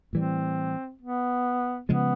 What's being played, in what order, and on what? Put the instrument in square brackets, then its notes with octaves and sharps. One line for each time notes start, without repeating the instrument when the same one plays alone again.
[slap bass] A2 E3 G3 [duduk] C4
[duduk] B3
[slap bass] C#3 F3 G#3 [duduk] B3